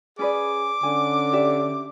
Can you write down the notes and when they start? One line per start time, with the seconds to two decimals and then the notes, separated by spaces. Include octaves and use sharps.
0.19 C#4 G#4 B4 D5 D6
0.83 D3 C#4 G#5
1.33 G4 D5 E5